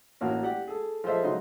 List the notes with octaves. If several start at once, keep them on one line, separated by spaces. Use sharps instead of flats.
A1 A#3 C#4 F#4
G4 D5 F#5
G#4 A4
F3 G#4 A4 C5 D#5 E5
C#3 F#3 G#3 D#4 D#5 C6